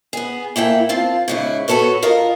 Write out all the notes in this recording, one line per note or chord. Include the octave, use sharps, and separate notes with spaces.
B3 G#4
A#3 E4 A4 G5
C4 F4 A5
G#2 C#3 E4
F#4 G4 A4 B4 C#5
F4 A#4 D#5